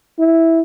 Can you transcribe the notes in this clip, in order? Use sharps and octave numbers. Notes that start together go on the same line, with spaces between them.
E4